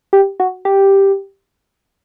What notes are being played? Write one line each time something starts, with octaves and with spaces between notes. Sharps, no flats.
G4
F#4
G4